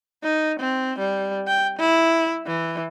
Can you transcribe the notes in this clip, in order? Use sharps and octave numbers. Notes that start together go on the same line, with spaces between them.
D#4
C4
G3
G5
E4
E3